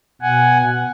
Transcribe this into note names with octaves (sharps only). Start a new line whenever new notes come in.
B2 F#5 G#5